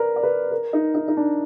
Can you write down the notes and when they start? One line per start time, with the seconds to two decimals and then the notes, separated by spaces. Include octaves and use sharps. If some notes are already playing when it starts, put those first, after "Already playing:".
Already playing: A#4 B4 D5
0.16 D5
0.23 B4
0.51 A#4
0.73 D#4
0.94 D#4
1.08 D#4
1.17 D4